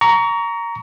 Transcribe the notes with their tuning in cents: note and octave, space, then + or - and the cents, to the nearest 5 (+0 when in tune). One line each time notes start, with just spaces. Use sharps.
A#5 +0 C#6 +30